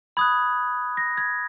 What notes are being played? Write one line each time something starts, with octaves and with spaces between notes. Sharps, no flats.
B5 D#6 F#6 G#6
A#6
G#6